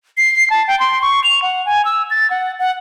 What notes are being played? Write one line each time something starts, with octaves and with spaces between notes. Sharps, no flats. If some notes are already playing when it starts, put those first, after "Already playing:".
C7
A5
G5
C6
C#6
F7
F#5
G#5
E6
A6
F#5
F#5